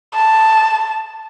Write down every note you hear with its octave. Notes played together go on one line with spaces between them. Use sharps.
A5